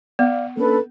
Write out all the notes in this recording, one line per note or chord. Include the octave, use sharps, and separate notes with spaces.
B3 D5 F5
A#3 C#4 D4 A4 B4